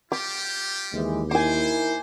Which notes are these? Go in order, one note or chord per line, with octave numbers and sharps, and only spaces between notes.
G3 F4 G4 D6
D#2 E3 G#3
D#4 E4 A#4 C5 G#5 D6